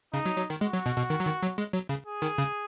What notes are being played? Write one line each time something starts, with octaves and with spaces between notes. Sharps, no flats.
C#3 D#4
F#3
F#3
D#3
G#3 F#4
F#3
B2
B2
D#3
F#3
D#3
F#3
G#3
F#3
C#3
G#4
D#3
C#3